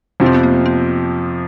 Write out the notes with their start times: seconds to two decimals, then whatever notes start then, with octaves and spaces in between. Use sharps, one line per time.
0.20 F2 C3 F3
0.26 C4
0.34 B3
0.43 A#3
0.66 C4